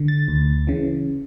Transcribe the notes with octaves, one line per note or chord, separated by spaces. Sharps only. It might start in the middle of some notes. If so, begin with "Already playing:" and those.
Already playing: D3
A6
D2
C#3 E3